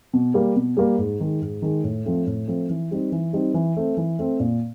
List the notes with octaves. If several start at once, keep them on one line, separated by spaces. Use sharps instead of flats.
B2
G3 A#3
B2
G3 A#3
G#2
D#3 G#3
G#2
D#3 G#3
A2
F3 A3 C4
A2
F3 A3 C4
E3
G3 C4 D#4
E3
G3 C4 D#4
E3
A3 C4
E3
A3 C4
A#2